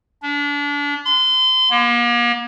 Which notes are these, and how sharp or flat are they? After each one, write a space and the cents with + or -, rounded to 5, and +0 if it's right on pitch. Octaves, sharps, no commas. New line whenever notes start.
D4 -30
C6 -35
A#3 +40